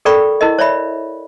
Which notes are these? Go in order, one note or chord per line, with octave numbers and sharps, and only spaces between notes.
A4 A#4 D5 G5 B5 C#6
E4 A#4 D#5
C#5 D5 E5 B5